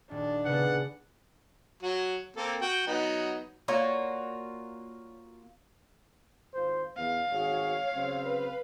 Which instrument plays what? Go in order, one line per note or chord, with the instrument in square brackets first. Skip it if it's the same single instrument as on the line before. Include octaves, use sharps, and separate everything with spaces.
[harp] D#1 [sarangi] D4
[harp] C#3 B3 [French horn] B4 [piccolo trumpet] F#5
[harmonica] F#3 F#4
A#3 C4 A4
F#4 G5
F#3 B3 D#4
[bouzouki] A#3 F4 F#4 [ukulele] C#5 D5
[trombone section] G#1 F4 C5
[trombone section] E2 B3 [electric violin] F5
[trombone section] G#1 F#4 G#4 [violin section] C#5
[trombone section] C#3 F#3 C4
[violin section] B4